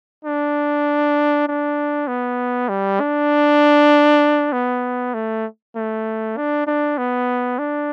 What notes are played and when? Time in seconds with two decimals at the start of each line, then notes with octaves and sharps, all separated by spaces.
0.25 D4
1.48 D4
2.08 B3
2.69 G3
3.00 D4
4.53 B3
5.14 A3
5.76 A3
6.37 D4
6.67 D4
6.98 B3
7.59 D4